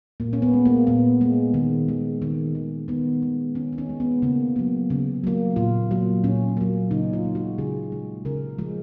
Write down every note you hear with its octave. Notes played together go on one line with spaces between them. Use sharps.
A#2 A#3
C#4
B3
G#3
A#3
A#2 B3
G#3
D#3
G#3
D#3
G#3
D#3 B3
G#3
D#3 C#4
D#4
C#4
G#3
B3
C#3 A#3
F#3 A#3
C#3
F#3 A#3
A#2 F4
F#3 A#3
A#2 C#4
F#3 A#3
C#3 D#4
F4
G#3
F#4
C#3 G#4
G#3
C#3 A#4
F3 G#3